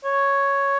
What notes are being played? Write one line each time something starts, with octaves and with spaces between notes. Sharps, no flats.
C#5